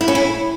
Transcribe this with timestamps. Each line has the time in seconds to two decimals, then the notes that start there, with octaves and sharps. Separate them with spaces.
0.01 E4
0.08 C#4
0.15 E4